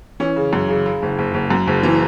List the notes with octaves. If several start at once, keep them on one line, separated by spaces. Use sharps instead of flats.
E3 C#4
C#3
F#2 C#4
C#3
C#3
F#1
F#1
F#1
F#2
F#1
E3